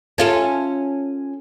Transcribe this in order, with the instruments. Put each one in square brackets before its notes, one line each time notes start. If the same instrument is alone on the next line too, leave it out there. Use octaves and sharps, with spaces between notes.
[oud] C#4 F4 A4